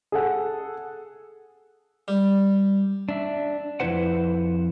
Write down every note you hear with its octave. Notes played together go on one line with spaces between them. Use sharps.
G#4 A4 F#5
G3
D4 E5
F2 G#3 E4 B4 C5 F#5